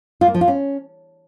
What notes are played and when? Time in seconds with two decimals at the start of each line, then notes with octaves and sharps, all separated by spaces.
0.21 F4
0.28 A#3
0.34 F3
0.41 F4
0.48 C#4